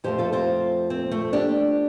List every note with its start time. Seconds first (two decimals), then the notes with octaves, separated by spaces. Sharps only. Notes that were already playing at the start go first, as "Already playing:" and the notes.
0.04 F2 F3 A3 G4 C5
0.18 F4 A4
0.33 C4 F4
0.90 C4
1.12 A3
1.33 D4 G4